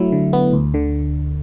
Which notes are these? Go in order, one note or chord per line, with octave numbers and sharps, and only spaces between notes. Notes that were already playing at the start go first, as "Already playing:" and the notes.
Already playing: F#3 A3 E4
D3
B3
D2
D3